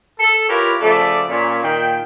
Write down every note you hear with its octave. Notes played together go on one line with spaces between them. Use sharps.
A4
E4 F4 G4 A#4 B4 C#5
C#3 F3 A3 A4 D5 A5
A#2 C#4
A#2 D#3 G5